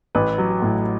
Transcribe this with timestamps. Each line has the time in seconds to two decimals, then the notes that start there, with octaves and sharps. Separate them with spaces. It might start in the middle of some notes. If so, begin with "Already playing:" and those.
0.15 A1 B4
0.38 F#3
0.62 A2